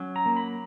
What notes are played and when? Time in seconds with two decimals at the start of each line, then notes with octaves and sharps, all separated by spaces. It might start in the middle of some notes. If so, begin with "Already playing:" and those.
Already playing: F#3 C#4
0.16 A#5
0.26 A#3
0.37 B5